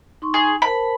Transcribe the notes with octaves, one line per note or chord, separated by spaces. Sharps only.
D#4 C6 C#6
G#4
A#4 C5 A5 B5